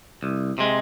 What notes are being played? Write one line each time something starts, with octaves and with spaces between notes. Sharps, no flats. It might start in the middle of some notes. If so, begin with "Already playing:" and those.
C2
C3 G#3